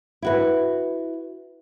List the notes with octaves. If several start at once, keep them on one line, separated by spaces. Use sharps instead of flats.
E4 F#4 B4